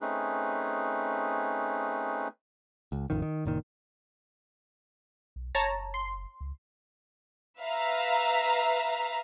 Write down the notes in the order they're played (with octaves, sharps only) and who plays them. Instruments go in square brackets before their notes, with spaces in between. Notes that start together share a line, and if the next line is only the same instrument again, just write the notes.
[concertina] A3 C4 C#4 D#4 G#4 B4
[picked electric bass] C#2
A1 F2 D#3
D#3
F#1 A#2 D#3
[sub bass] B1
[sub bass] F#1 [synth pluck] C#5 A5 A#5
[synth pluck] C6
[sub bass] C#2
[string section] B4 E5 F5 A#5